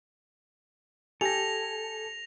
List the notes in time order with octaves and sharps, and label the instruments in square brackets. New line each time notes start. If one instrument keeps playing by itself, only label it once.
[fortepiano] G4 G#5 [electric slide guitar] A4 [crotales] A#6 F7